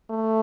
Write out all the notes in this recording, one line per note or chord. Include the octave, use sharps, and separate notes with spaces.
A3